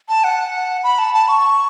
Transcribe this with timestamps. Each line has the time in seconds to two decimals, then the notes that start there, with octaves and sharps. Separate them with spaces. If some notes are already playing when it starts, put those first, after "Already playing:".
0.09 A5
0.24 F#5
0.84 B5
0.99 A5
1.14 A5
1.28 C#6